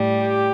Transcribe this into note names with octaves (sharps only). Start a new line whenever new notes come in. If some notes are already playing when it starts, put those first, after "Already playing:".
Already playing: A2 G3
G4